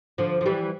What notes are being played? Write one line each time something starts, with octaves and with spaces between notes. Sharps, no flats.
D3 F3
F3
E3 G3